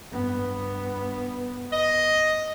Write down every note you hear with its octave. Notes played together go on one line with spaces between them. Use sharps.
G2 B3
D#5